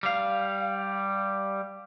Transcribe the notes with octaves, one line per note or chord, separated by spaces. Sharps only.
G3 F5